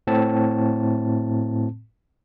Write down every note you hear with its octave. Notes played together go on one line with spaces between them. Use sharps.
A2 C4 A5